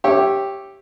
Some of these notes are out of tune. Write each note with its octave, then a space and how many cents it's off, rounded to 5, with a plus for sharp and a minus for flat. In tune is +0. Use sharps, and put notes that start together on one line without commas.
G4 +0 C#5 -20 E5 +0